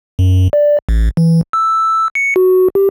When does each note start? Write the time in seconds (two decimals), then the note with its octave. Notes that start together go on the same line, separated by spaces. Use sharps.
0.19 F#2
0.53 D5
0.89 A1
1.17 E3
1.53 E6
2.15 C#7
2.36 F#4
2.75 G4